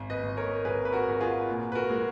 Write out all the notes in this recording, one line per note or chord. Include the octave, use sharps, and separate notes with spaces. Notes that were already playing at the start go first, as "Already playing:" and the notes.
Already playing: G#1
B4 D#5
G#1
A#4 C#5
G#1 G#4 B4
B4
F#4 A#4
G#1
F4 G#4
A#2
B4
F#4 A#4
G#3